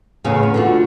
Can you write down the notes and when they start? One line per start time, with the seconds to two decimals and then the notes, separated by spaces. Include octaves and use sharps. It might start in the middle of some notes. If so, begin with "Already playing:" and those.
0.24 E2 A2 C#3 G#4 C#5 F5
0.43 B3
0.54 D3 F4 F#4